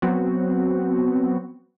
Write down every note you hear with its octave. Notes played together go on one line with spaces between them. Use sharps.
F#3 B3 C4 F#4